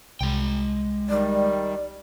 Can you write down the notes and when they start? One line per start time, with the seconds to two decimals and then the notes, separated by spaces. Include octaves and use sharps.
0.21 C2 G#3 G5
1.09 D#3 G3 D5